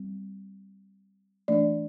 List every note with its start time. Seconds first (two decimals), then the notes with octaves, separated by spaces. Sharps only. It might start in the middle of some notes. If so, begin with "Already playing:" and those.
Already playing: G3 C4
1.48 E3 A3 D4 D5